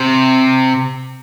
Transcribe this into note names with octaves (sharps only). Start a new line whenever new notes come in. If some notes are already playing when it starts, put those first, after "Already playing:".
Already playing: C3